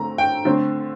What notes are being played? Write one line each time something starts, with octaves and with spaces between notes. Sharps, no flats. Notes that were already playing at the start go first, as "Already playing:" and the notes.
Already playing: D3 A3 C4 A#5
G5
D3 A3 C4